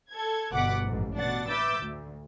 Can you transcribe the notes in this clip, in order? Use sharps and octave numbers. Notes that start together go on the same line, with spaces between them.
A4 G#6
G1 B2 F#5 D6 B6
A1 F2 G#2
B2 D4 F#5 A6
B4 E5 D6 E6 G6 A6
D2